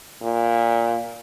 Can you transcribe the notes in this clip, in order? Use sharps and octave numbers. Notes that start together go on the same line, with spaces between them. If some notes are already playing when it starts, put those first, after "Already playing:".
A#2